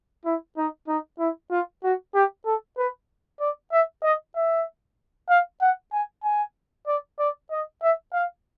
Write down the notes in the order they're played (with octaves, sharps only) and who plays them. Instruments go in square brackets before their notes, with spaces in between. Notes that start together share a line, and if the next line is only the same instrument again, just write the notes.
[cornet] E4
D#4
D#4
E4
F4
F#4
G4
A4
B4
D5
E5
D#5
E5
F5
F#5
G#5
G#5
D5
D5
D#5
E5
F5